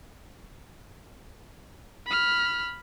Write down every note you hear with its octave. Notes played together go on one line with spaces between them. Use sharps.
B5 F6